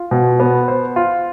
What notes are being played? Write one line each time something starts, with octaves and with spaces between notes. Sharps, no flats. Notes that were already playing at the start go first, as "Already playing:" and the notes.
Already playing: F4
B2
B3
C5
F4